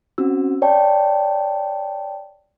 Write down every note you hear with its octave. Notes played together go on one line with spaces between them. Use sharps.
C4 C#4 F#4 E6
C#5 D5 G5 A5